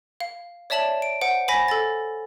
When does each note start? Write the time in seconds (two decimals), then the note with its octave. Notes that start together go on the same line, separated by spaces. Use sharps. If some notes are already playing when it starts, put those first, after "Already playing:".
0.20 F5
0.70 C#5 D5 E5 A5 E7 F#7
1.02 D7
1.21 C5 F#5 D7
1.48 C5 G#5 B5 A#6 B6
1.68 A4 A6